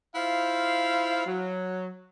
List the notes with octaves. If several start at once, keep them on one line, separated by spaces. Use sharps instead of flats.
E4 F4 C5 F5
F#3